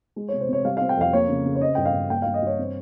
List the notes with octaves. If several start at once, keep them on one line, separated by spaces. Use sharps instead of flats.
G#3
C3 C#5
C5
C3 C#5
G3 F5
C4 F5
G5
F2 F5
A#3 C#5
C#3
C#3
C#5
C4 D#5
G2 G5
F5
G2
A#3 G5
G2 F5
D#5
G2 C#5
C4